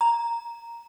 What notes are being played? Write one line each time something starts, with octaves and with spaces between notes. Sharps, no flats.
A#5